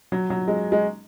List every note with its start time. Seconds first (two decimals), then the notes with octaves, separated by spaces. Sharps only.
0.12 F#3
0.30 F#3
0.48 G#3
0.72 G#3